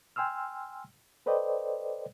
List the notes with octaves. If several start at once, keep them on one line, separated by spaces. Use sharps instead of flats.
G5 G#5 C6 E6 F6
A4 B4 C5 D5 D#5 G5